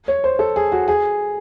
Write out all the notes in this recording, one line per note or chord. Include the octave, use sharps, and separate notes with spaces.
C#5
C5
A4
G#4
F#4
G#4